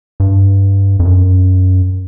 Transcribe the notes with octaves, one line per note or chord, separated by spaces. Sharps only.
G2
F2
F#2